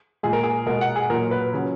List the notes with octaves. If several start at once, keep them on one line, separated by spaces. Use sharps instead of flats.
A#2 G#3 G#4
A#4
G#4
B2 G#3 A#4
F#5
G#4
A#2 F#3 A#4
B4
C#3 F#3